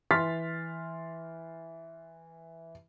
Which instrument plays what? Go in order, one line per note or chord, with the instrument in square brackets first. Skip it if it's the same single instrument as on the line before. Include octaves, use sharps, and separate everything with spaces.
[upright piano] E3 C6 F6 A6 B6